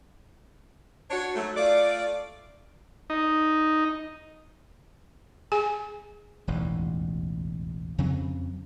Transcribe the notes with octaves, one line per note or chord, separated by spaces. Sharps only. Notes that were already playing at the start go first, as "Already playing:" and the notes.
D4 F#4 C#5
G#2 F#3 A3
A3 F4 D5
D#4
G#4 G#5
E1 A1 D#2
F2 C#3 F#3 C4